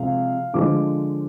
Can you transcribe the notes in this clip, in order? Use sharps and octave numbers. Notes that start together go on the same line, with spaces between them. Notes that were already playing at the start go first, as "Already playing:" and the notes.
Already playing: C3 F3 G#3 F5
D3 F3 G#3 D6